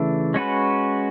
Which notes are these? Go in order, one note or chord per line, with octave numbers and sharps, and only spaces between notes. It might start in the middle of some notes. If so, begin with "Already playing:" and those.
Already playing: C#3 E3 A3 D4
G#3 C#4 F#4 B4